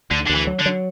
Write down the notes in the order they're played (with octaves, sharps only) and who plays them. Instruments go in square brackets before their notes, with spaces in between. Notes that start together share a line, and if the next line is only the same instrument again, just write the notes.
[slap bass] D2 [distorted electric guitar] D3
[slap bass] D2 [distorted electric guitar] D3
[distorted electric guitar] E3
[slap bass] F#3
[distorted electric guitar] D3
[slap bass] F#3